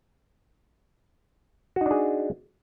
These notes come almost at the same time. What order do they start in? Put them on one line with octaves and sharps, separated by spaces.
F#4 D#4 D4 G#4